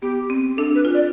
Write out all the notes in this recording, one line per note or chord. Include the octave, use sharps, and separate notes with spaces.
B3 G4
C4
D4 A4
B4
F4
D5